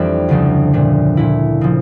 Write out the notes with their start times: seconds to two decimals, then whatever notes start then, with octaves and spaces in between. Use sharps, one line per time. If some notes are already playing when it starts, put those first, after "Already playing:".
Already playing: F2 E3 G3 A3 D4 A4
0.29 D2 C#3 F3 A3 D4
0.73 A#2 A3 D4
1.17 A#2 A3 E4
1.61 C#3 F3